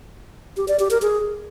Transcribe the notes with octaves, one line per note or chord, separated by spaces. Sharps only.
G4
D5
G4
A#4
G#4